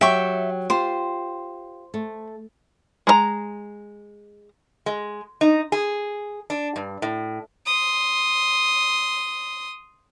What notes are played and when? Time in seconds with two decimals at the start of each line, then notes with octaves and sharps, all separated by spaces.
0.01 F#3 G4 E5 G5 C#6
0.70 F4 G4 C5
1.94 A3
3.07 G#3 A#4 A#5
4.86 G#3
5.41 D#4
5.72 G#4
6.50 D4
6.76 G2
7.02 A2
7.66 C6 D#6